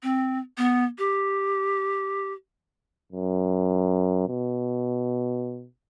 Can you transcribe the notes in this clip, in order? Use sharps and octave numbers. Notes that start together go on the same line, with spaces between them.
C4
B3
G4
F#2
B2